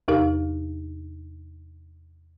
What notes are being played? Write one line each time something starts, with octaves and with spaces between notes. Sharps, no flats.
E2 C3 D#4 G4 A#4 F5